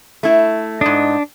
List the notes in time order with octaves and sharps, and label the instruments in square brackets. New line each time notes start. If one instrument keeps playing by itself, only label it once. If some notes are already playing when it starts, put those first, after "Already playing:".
[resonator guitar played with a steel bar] A3 E4
[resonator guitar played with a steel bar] G#2 D#5 [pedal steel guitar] D4